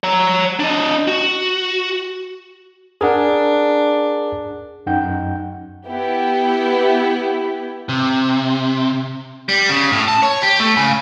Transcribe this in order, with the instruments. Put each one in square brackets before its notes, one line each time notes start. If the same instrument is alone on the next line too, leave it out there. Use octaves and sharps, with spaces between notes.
[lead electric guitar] C#5 A#5
D4 D#5
F#4
[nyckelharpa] D4 [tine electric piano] G#4 A#4 F#5
[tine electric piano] F#2 D#4 F#5 G5 G6
[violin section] B3 E4 G4
[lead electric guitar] C3
[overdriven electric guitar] G3
C#3
A2
A5
C#5
G4
A3
C#3